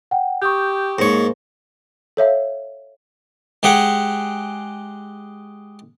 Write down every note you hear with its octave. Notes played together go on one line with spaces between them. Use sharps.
F#5 G5
G4 C#6 D#6 G6
G#2 G#3 A#3 D#4 C5 C#5 A#6
A4 C#5 E5 F5
G#3 G4 G#4 F#5